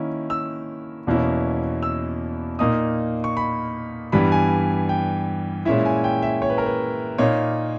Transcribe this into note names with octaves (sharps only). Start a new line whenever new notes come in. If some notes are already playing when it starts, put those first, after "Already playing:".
Already playing: D#3 A#3 C#4 E4
E6
E2 B2 A#3 C#4 E4
E6
A#2 A#3 D#4 D#6
C#6
B5
G2 E3 G3 B3 B5
G#5
G5
A#2 G#3 C#4 E4 E5
G#5
G5
E5
C#5
B4
A#4
B4
A#2 A#3 D#4 C#5